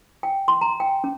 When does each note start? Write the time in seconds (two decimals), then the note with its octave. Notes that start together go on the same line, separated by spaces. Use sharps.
0.23 G5
0.48 C6
0.61 A#5
0.80 G5
1.04 C#4